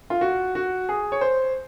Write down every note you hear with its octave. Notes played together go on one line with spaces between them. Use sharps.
F4
F#4
F#4
G#4
C#5
C5